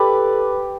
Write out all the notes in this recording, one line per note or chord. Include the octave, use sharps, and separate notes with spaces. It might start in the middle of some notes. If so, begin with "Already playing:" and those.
Already playing: G4 A4 B4 D5